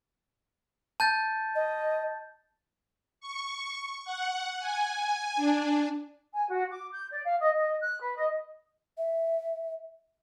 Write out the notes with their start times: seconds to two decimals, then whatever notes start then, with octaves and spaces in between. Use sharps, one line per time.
1.00 A5 G6 A6
1.55 D#5
3.20 C#6
4.05 F#5
4.59 G#5
5.36 D4
6.32 G#5
6.49 F#4
6.71 D6
6.93 G6
7.11 D5
7.24 F5
7.39 D#5
7.56 D#5
7.81 F#6
8.00 B4
8.15 D#5
8.98 E5